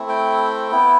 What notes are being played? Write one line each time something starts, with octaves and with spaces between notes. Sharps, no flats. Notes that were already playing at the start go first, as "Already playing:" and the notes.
Already playing: A3 C4 E4
G5
B3 E4